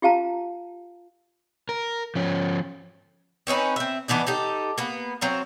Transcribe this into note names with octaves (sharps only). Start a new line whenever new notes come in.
F4 G4 F5 A5 A#5
A#4
F3 C#4
C4 C#4 D#4 B4
C4 E5
E3 B3 D4 D#4
D#4 G4 A4
A#3 B3
F#3 C4 F5 A#5